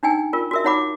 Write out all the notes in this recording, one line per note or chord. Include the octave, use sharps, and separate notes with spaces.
D4 D#4 G5 G#5
F4 A#4
F#4 A#4 E5
D#4 C#5 F#5 B5 D6